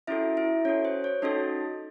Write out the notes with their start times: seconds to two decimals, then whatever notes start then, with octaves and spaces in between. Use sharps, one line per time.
0.07 C#4 E4 F#4 A4 E5
0.37 E4 E5
0.65 C#4 F#4 A4 C#5
0.85 C5
1.04 C#5
1.22 C#4 D#4 F#4 A4 D#5